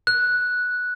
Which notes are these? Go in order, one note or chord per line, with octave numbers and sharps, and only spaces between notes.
F#6